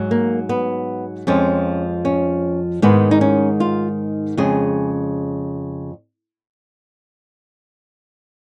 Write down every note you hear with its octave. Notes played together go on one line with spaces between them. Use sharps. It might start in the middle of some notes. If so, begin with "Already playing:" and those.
Already playing: G#2 F#3
A#3
B3
F2 F3 G#3 C#4
C#4
G#2 D#3 G#3 B3
D#4
C#4
F4
F2 C#3 G#3 G#4